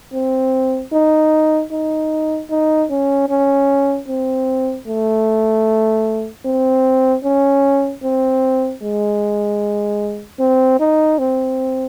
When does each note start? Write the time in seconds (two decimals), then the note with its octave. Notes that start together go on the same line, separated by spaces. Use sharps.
0.13 C4
0.92 D#4
1.71 D#4
2.49 D#4
2.90 C#4
3.29 C#4
4.08 C4
4.87 A3
6.45 C4
7.24 C#4
8.03 C4
8.82 G#3
10.40 C4
10.80 D#4
11.19 C4